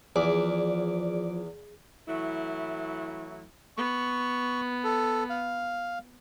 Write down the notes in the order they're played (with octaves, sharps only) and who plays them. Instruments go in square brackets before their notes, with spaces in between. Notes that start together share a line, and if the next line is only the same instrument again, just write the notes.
[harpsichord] E2 [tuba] F3 [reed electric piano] G#4 [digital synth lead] D5
[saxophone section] E3 F#3 A3 E4
[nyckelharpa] B3 [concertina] C#6
[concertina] A4
F5